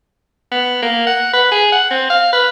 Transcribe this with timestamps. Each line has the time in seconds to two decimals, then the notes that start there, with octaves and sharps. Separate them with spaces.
0.52 B3
0.82 A#3
1.07 F#5
1.33 B4
1.52 G#4
1.72 F#5
1.91 C4
2.10 F5
2.33 B4